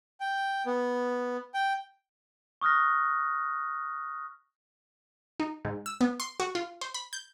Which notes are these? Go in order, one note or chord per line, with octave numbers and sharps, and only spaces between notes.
G5
B3
G5
C#6 D#6 F6 F#6 A#6
D#4
G#2
E6
B3
C6
F#4
F4
C5
B5
G6